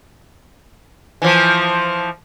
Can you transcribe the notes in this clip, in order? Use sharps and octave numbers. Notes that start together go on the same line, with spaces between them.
E3 F3